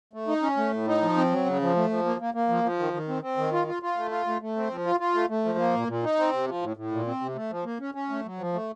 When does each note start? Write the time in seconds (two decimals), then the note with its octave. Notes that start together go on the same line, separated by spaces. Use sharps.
0.13 A3
0.28 D#4
0.42 C#4
0.57 A3
0.72 A2
0.87 D#4
1.02 F3
1.16 C4
1.31 F#3
1.46 C#3
1.61 F3
1.76 A3
1.90 F3
2.05 A#3
2.20 A#3
2.34 A#3
2.49 F3
2.64 F3
2.79 D#3
2.93 D#3
3.08 C4
3.22 C4
3.37 D#3
3.53 F4
3.67 F4
3.83 F4
3.97 A3
4.11 F4
4.26 A3
4.41 A3
4.56 C4
4.71 F3
4.85 F4
5.00 F4
5.14 A3
5.29 A3
5.45 F3
5.58 A#3
5.74 A#2
5.88 A#2
6.03 D#4
6.19 C4
6.33 C3
6.48 F3
6.62 A2
6.77 A2
6.92 A#2
7.07 C4
7.21 C3
7.35 A3
7.51 F3
7.65 A#3
7.80 C#4
7.95 C#4
8.10 A3
8.25 F#3
8.39 F3
8.53 A3